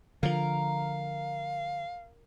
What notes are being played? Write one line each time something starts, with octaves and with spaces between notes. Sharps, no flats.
D3 F3 A#4 F5